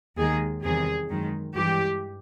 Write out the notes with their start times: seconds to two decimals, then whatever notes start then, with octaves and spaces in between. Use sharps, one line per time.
0.17 D#2 D#3 G#3 G#4
0.63 E2 C3 D#3 G3 G#4
1.09 F#2 D#3 G#3
1.55 G2 E3 G#3 G4